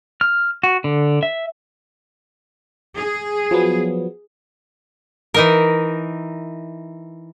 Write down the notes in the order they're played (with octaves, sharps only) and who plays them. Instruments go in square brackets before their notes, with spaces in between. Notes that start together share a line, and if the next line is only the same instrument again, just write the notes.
[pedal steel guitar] F6
F#4
D3
E5
[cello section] G#4
[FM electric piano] F3 F#3 B3
[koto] E3 D#4 A#4